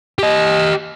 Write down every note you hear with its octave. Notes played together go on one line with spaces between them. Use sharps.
G4 D#5